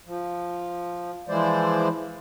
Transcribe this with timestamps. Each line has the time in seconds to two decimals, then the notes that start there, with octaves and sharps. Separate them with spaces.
0.05 F3
1.29 E3 F3 G#3 E4 C5 D5